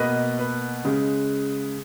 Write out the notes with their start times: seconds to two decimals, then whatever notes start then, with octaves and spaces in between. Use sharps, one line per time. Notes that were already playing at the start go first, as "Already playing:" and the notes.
Already playing: B2 A#3 B4 D#5
0.39 B4
0.85 C#3 G#3